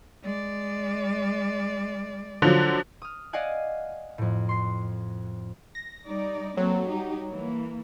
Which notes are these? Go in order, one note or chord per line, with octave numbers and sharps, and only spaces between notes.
G#3 D5
D3 F3 F#3
D#6 F6
D5 D#5 F5 F#5 G#5 F#6
F2 A2
C6 C7
A#6
G3 D#4 D5
F#3 A#3 C4 A4
G3 D#4 G4
E3 A#3